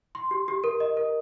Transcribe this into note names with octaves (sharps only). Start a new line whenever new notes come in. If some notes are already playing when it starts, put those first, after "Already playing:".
C6
G4
G4
A#4
D#5
A#4